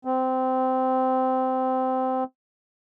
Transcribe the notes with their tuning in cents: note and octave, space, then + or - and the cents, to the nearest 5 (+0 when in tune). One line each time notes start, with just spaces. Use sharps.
C4 -15